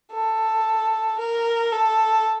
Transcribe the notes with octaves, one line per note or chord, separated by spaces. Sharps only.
A4
A#4
A4